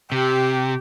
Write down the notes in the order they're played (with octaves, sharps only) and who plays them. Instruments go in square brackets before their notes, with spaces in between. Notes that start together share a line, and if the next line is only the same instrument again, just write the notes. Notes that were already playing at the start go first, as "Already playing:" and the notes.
[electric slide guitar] C3 [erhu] G4